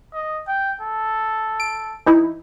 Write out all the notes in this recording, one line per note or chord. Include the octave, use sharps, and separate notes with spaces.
D#5
G5
A4
D7
E3 D#4 E4